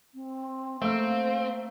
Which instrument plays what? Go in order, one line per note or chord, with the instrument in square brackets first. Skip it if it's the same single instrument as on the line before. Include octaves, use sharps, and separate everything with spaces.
[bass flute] C4
[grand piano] A3 A#3 E6 [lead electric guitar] C4 [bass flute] F5